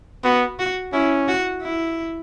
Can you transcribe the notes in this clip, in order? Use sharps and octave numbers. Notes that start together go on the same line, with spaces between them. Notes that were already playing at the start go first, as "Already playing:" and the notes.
B3 F#4
F#4
C#4 E4
F#4
E4